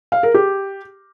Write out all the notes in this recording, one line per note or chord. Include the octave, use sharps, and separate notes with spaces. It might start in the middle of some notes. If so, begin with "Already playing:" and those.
F5
A#4
G4